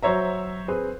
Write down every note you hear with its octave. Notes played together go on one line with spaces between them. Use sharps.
F#3 C5 C#5 E5 A#5
C4 G#4 B4